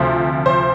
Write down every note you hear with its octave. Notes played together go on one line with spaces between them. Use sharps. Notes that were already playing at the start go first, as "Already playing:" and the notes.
Already playing: D2 C3 F3 C5
C5